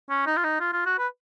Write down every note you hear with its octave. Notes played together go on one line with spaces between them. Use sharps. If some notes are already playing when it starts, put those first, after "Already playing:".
C#4
D#4
F4
D#4
F4
F4
F#4
B4